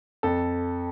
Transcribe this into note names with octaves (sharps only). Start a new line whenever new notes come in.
F2 A4